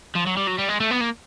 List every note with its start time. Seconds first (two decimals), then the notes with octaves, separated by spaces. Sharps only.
0.16 F3
0.27 F#3
0.37 G3
0.48 F#3
0.59 G3
0.69 G#3
0.80 A3
0.91 B3
1.01 A#3